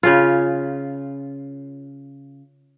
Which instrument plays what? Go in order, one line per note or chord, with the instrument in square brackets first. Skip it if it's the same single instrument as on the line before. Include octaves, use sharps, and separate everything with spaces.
[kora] C#3 C#4 F4